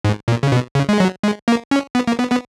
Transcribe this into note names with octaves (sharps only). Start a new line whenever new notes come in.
G#2
A#2
C#3
B2
C#3
G#3
F#3
G#3
A#3
C#4
B3
A#3
B3
B3